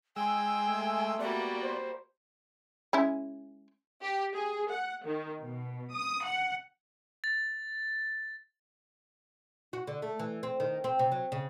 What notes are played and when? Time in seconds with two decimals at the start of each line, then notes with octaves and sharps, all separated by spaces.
0.16 G#3 G5 G#5 C6 E6
0.68 A3
1.19 G3 A#3 B3 F#4 D5
1.63 C5
2.93 G#3 C#4 E4
4.02 G4
4.34 G#4
4.71 F#5
5.06 D#3
5.41 B2
5.92 D#6
6.26 F#5
7.24 A6
9.73 F#4
9.87 D3
10.02 A3
10.19 E3
10.43 C4
10.60 D#3
10.84 C4
10.99 C3
11.12 F#3
11.32 C#3